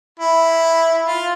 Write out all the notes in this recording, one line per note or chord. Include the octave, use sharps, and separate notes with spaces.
E4
F4